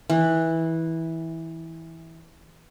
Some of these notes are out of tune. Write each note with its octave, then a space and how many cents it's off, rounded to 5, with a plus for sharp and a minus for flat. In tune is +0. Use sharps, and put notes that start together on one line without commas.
E3 -15